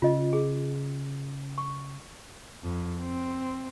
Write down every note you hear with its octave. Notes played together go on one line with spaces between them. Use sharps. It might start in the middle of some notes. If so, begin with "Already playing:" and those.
C#3 F4 D#5
G#4
C#6
F2
C4